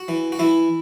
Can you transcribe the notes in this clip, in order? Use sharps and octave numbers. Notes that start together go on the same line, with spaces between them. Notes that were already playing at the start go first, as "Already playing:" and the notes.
Already playing: F#4
E3
F#4
E3 E4